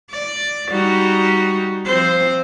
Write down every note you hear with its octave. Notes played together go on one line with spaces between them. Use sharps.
D5
G3 D#4 F#4
F3 C4 C5